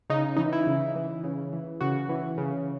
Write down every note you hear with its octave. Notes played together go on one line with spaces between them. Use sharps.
C#3 D#4
E3 D#4
E4
C#3
E3
C#3
E3
C#3 F#4
E3
C#3